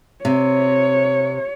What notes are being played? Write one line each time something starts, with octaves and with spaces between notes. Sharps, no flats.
C3 C#5